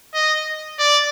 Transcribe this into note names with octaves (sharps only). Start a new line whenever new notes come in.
D#5
D5